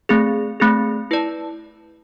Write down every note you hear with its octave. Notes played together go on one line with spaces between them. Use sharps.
A3 C4 G#4
A3 C4 G#4
E4 B4 D5 A5